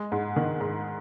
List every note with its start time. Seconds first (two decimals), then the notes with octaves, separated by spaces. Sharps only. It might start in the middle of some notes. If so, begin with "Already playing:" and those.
Already playing: G#3
0.12 G#2
0.36 D#3
0.61 G#2